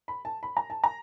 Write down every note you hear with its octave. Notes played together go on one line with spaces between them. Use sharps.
B5
A5
B5
A#5
A5
A#5